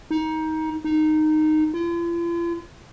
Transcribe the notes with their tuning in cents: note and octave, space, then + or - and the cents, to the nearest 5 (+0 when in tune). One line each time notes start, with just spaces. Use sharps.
D#4 +20
D#4 -10
F4 -45